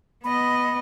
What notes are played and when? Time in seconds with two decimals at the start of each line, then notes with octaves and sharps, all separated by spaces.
0.24 B3 D#5 B5